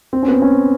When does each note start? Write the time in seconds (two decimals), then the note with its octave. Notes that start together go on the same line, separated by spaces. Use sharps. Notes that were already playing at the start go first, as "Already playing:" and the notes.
0.13 C4
0.23 C#4
0.28 B3
0.32 C4
0.42 C#4